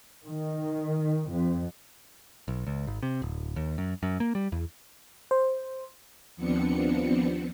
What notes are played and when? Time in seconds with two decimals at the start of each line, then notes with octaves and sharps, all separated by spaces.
0.25 D#3
1.29 F2
2.48 B1
2.67 C#2
2.87 G#1
3.03 C3
3.22 D1
3.56 D#2
3.78 F#2
4.03 F#2
4.20 A#3
4.35 G3
4.52 E2
5.31 C5
6.36 D#2 F3 B3 C4 D4 C#7